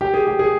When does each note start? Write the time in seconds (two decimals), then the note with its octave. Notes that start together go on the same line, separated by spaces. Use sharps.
0.01 G4
0.14 G#4
0.27 G4
0.39 G#4